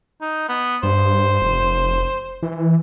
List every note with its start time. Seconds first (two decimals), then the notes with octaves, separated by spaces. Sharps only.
0.21 D#4
0.49 B3
0.83 G2 C5
1.42 F1
2.43 E3